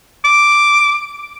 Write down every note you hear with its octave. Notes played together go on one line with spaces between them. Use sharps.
D6